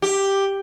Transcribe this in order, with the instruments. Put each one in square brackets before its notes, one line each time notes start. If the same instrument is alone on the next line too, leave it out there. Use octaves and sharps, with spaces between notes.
[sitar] G4